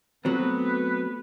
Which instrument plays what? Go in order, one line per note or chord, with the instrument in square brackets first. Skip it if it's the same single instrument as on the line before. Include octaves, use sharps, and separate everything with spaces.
[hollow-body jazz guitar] F#3 C4 [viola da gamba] A3 B3 [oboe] B4